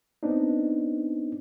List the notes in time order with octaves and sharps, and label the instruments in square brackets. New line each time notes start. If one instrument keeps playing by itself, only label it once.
[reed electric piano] B3 C4 D4 D#4